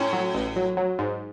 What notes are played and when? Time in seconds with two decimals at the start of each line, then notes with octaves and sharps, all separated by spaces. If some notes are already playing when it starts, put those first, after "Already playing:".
Already playing: A2 C#4
0.13 F#3
0.35 A1
0.56 F#3
0.77 F#3
0.99 G#2